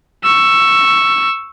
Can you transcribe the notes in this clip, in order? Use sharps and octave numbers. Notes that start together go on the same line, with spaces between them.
C#6 E6